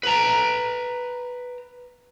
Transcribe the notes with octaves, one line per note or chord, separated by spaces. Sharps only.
B4 A#5